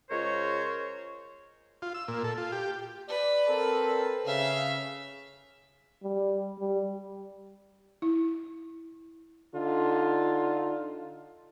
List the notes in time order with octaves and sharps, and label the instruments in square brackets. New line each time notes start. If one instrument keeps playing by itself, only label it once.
[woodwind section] C#3 G#3 F4 A#4 C5 C#5
[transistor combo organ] F4
E6
A#2
A4
F4
G4
[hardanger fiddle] B4 [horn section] D5
[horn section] C4 A4 A#4
[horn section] C#3 [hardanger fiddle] E5 F5
[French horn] G3
G3
[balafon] E4
[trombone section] D3 D#4 F4